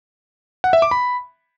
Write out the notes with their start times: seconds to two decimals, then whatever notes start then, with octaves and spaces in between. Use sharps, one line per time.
0.64 F#5
0.73 E5
0.82 D6
0.91 B5